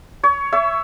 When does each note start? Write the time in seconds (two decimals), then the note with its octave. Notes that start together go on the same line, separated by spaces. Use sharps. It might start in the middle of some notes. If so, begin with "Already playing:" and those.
0.23 C#5
0.53 C#5 E5